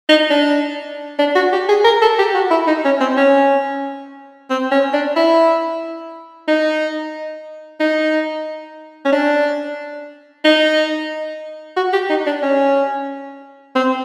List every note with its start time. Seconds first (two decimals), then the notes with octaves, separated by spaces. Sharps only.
0.09 D#4
0.30 D4
1.19 D4
1.35 F#4
1.53 G4
1.69 G#4
1.84 A#4
2.02 A4
2.19 G4
2.34 F#4
2.51 E4
2.67 D#4
2.85 C#4
3.00 C4
3.17 C#4
4.50 C4
4.71 C#4
4.93 D4
5.16 E4
6.48 D#4
7.80 D#4
9.05 C#4
9.12 D4
10.44 D#4
11.77 F#4
11.93 G4
12.10 D#4
12.26 D4
12.43 C#4
13.75 C4